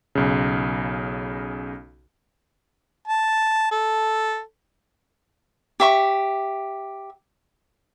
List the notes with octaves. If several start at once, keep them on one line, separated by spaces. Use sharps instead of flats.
B1 C#3
A5
A4
G4 E5 C#6